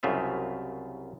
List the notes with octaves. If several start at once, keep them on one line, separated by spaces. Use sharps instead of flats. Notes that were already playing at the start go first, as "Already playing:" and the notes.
C2 F#2 C#3 F4 E5